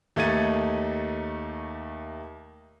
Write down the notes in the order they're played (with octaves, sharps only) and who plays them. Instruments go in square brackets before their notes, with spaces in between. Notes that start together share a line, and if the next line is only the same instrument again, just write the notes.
[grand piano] D#2 A3 D#4 G#6 A6 D#7